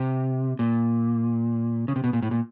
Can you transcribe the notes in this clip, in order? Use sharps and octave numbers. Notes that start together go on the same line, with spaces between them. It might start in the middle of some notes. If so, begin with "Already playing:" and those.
Already playing: C3
A#2
C#3
C3
B2
A#2
A2
A#2